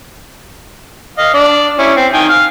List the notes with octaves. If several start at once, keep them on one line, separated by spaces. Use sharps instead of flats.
D#5 F5
D4 D5
C#4 E4
C4
D#3 G5 G#5
F5